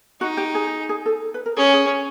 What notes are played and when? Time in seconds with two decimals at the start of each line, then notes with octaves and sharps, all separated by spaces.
0.21 D#4 F#4
0.37 G4
0.55 G#4
0.89 G#4
1.06 A4
1.34 B4
1.46 A#4
1.57 C#4 G#4
1.74 G#4